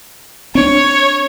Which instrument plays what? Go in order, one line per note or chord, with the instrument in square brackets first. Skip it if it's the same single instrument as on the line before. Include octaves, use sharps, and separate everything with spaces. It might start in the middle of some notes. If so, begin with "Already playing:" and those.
[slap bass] C4 D4 [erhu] C#5